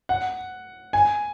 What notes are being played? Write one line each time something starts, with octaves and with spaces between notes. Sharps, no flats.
F#5
G#5